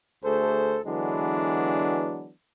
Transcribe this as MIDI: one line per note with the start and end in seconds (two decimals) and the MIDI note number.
0.24 0.79 38
0.24 0.79 57
0.24 0.79 68
0.24 0.79 69
0.24 0.79 72
0.85 2.31 50
0.85 2.31 52
0.85 2.31 54
0.85 2.31 56
0.85 2.31 59
0.85 2.31 62